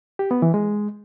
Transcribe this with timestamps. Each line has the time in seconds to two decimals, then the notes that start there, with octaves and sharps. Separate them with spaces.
0.19 G4
0.31 B3
0.42 E3
0.54 G#3